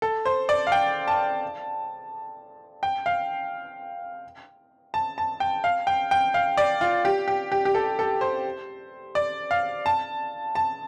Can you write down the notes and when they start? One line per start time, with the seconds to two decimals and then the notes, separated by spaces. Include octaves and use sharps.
0.02 A4
0.25 C5
0.49 D5
0.67 F5
0.72 G5
1.08 A5
2.83 G5
3.06 F5
4.94 A5
5.18 A5
5.40 G5
5.64 F5
5.87 G5
6.11 G5
6.34 F5
6.57 D5
6.81 F4
7.05 G4
7.28 G4
7.52 G4
7.65 G4
7.75 A4
7.99 A4
8.21 C5
9.15 D5
9.51 F5
9.86 A5
10.55 A5